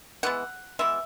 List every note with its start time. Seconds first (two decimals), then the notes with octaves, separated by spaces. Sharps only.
0.23 E3 G#3 B3 F#5
0.79 E3 G#3 B3 E5